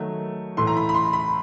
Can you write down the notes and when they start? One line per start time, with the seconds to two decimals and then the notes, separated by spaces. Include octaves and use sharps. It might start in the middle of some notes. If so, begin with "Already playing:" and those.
Already playing: D#3 F#3 A3
0.57 A2 E3 A3 C6
0.67 A#5
0.77 B5
0.89 B5
0.94 C6
1.13 B5